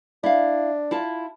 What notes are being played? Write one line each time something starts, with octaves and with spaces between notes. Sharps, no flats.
D4 E4 F5
E4 F4 A5